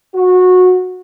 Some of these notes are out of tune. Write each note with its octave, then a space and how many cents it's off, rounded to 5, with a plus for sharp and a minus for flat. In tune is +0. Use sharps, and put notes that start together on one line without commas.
F#4 -20